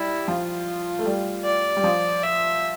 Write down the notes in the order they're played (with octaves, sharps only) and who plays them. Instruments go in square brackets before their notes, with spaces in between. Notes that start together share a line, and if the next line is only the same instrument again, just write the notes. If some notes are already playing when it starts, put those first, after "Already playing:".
Already playing: [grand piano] G3 [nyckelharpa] E4
[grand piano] F3 [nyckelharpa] F4
[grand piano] A3
G3
[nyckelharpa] D5
[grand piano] G3
F3
[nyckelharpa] E5